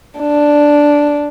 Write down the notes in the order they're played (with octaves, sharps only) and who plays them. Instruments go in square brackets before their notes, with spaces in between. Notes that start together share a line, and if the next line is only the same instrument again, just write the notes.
[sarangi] D4